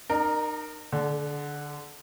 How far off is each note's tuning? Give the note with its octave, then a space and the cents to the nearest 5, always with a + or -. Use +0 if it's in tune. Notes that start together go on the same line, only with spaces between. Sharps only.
D#4 -35 A#4 +0 D5 +30
D3 +0 A4 -40